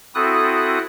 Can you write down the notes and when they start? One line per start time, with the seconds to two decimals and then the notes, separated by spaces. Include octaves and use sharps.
0.15 C4 E4 F#4 A4 D#6 F#6